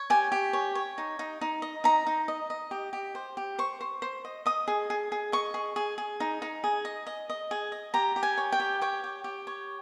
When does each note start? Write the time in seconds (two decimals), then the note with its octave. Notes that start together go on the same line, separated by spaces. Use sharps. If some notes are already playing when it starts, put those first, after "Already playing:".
Already playing: C#5
0.10 G4 G#5
0.32 G4
0.53 C#5
0.75 C#5
0.98 D#4
1.19 D#4
1.41 D#4
1.62 D#5
1.84 D#4 A#5
2.07 D#4
2.28 D#5
2.50 D#5
2.71 G4
2.93 G4
3.15 C5
3.37 G4
3.59 C5 C#6
3.81 C5
4.02 C5
4.25 D#5
4.46 D#5 D#6
4.68 G#4
4.90 G#4
5.12 G#4
5.32 D#5 C#6
5.54 G#4
5.76 G#4
5.98 G#4
6.20 D#4
6.42 D#4
6.64 G#4
6.85 D#5
7.07 D#5
7.30 D#5
7.51 G#4
7.72 D#5
7.94 G4 A#5
8.16 G4
8.23 G#5
8.38 C#5
8.52 G5
8.60 G4
8.82 C#5 G5
9.04 G4
9.24 G4
9.47 C#5